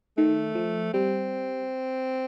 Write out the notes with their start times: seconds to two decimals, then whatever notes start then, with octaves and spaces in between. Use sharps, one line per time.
0.17 D#3 A3
0.55 F3
0.93 G3 C4